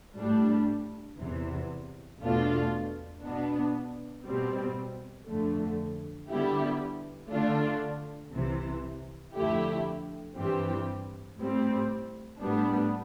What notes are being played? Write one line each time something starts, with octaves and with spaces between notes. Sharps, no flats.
A2 G3 D4
E2 C3 E3
E2 B2 A3 D4 F4
B2 B3 D4
B2 G3 C4
F2 D3 A3
D3 G3 B3 E4 G4
D3 A3 D4 F4
C2 C3 E3
F2 D3 A3 E4 G4
G2 E3 G3 C4 G4
A2 G3 C4
A2 G3 B3 D4